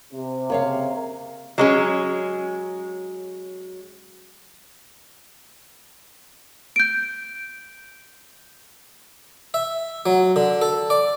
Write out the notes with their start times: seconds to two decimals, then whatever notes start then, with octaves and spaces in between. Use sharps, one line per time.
0.13 C3
0.50 C#3 A#3 C#5 F5
1.58 F#3 G#3 C#4
6.76 G6 D7
9.54 E5
10.06 F#3
10.36 D3
10.61 A4
10.90 D5